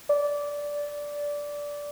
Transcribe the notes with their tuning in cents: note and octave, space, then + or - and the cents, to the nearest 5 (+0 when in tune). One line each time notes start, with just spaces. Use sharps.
D5 -15